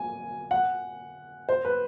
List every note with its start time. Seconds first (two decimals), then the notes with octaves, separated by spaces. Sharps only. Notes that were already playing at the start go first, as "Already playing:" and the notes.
Already playing: G#5
0.51 F#5
1.49 C5
1.65 B4